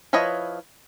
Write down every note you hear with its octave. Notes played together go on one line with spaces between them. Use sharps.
F3 E4 B4 C#5 D#5